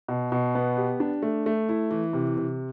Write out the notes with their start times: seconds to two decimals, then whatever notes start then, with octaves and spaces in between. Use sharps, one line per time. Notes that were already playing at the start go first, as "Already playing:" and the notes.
0.08 B2
0.32 B2
0.55 B3
0.77 G4
1.00 D4
1.22 A3
1.46 A3
1.69 E4
1.91 E3
2.13 C3
2.37 C3